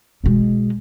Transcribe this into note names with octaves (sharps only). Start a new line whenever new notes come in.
B2 G#3